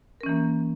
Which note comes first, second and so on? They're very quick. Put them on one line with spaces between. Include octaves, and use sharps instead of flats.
A#4 C#4 E3 A#3